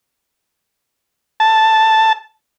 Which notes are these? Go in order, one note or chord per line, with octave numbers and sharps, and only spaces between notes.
A5